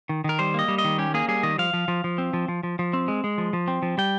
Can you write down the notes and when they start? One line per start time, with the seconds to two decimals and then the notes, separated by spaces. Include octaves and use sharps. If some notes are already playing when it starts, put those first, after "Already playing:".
0.09 D#3
0.24 D#3 A#4
0.39 G3 C5
0.54 A#3 D#5
0.68 G3
0.78 D#5
0.84 D#3
0.98 C#4 G4
1.14 A#3 G#4
1.28 G3 G#4
1.43 D#3 D#5
1.58 F3 F5
1.73 F3
1.88 F3
2.04 F3
2.18 C4
2.33 F3
2.48 F3
2.63 F3
2.79 F3
2.93 C4
3.08 G#3
3.24 G#3
3.38 F3
3.53 F3
3.68 C4
3.82 F3
3.98 G3 G5